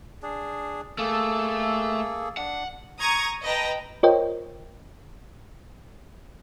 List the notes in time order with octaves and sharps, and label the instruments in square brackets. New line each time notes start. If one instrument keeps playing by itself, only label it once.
[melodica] D4 G#4
[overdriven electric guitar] A3 [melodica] A#3 G#4 A4
[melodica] D4 [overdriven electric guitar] F#5
[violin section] A#5 C#6 D#6 G#6
B4 D#5 G5 A5 A#5
[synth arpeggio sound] F4 A#4 C5 C#5 D#5 G5